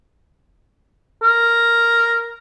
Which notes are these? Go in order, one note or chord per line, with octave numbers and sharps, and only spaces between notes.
A#4